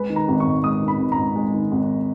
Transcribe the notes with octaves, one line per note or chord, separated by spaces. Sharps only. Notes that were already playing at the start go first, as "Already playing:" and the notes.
Already playing: G#3 B4
D#3
A#5
G#1
C#6
G#2
G#3 D#6
D#3
B5
G#1
A#5
G#2
G#3
D#3
G#1